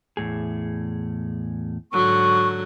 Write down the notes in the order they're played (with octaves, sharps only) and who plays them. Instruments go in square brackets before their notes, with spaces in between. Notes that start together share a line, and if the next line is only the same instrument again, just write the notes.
[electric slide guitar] E2 A2 G#4
[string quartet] G#2 D3 F#3 [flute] C#6